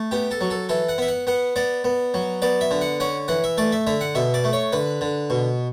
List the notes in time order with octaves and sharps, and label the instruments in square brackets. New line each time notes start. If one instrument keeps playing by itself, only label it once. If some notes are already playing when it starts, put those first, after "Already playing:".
Already playing: [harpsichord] A3
B3 G4
A4
F#3
A4
E3 A4
F#5
B3 E5
F#5
B3 F#5
B3 D5
B3
F#3
B3 D5
E5
D3
F#5
C#4 F#5
E3 F#5
E5
A3 D5
E5
D3 E5
F#5
B2 E5
D5
A3
C#5
D3 B4
D3
B2